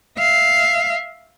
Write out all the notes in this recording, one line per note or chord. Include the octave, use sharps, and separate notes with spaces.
E5 F5